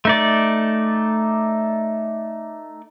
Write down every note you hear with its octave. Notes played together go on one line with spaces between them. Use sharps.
A3 D#4 D5